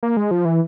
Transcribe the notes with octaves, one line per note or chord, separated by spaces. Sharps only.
A#3
G#3
F3
E3